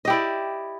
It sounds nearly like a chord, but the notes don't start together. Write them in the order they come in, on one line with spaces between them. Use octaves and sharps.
D#5 G4 E4 D5